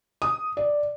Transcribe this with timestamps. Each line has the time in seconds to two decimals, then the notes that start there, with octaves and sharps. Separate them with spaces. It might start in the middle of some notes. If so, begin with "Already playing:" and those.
0.22 D#6
0.57 D5